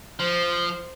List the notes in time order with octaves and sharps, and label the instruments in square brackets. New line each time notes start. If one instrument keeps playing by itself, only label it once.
[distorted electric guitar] F3 [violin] C5